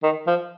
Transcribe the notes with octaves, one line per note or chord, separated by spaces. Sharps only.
D#3
F3